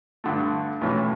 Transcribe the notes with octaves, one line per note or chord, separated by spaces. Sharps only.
G2 D3 A3
B1 A2 E3 A3 C#4